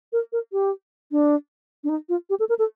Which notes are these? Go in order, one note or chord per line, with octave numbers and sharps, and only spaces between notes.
A#4
A#4
G4
D4
D4
D#4
F4
G4
A4
A#4
A4